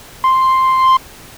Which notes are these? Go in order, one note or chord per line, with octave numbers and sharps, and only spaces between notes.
C6